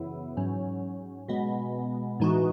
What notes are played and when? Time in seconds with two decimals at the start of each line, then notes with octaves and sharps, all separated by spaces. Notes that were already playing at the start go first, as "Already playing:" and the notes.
Already playing: F#2 C#3 E3 B3 E4
0.37 G#2 F#3 C#4
1.28 B2 G#3 B3
2.20 A2 E3 G#3 D#4 F#4